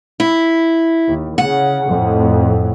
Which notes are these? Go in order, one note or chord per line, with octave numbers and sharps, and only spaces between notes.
E4
D#2
C#3 F#5
F2 A2